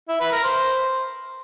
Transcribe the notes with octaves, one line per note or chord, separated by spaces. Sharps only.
E4
B4
A#4
C5